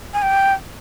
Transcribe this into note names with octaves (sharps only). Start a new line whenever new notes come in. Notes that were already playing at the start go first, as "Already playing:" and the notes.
G#5
G5